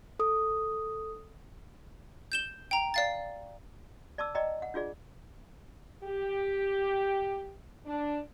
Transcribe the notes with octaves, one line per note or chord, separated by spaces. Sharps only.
A4 D#6
G6 E7 G7
G5 A#5
D5 F5 A6
D5 A5 D6 E6
D5 D#5 G5 A#5
F#5
D4 F4 G#4 D5
G4
D4